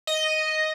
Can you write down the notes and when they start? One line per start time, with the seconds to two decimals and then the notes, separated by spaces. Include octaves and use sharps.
0.07 D#5